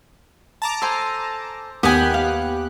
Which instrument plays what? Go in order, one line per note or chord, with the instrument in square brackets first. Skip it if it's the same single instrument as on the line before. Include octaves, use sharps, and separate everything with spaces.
[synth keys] A5 A#5 D6
[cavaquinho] A4 C5 G#5
[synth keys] D#2 G4 F#6 [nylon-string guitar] B3 [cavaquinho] G5 G#5 D#6
[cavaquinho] F5